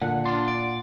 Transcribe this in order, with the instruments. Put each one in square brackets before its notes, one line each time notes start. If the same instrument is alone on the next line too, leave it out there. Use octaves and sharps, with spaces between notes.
[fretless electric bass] A#2 [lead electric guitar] D3 [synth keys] F#5
[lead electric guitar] D4 F4 [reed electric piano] C6
[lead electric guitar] D5